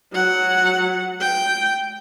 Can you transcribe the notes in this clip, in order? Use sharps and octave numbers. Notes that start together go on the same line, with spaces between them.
F#3 F#5
G5